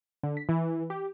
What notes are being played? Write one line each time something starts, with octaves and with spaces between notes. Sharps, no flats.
D3
B6
E3
G4